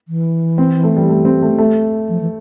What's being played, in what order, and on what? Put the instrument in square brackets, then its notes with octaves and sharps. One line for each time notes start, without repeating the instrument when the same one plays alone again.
[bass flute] E3
[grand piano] C4
A3
G3
A3
C4
A3
A3
[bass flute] F3
E3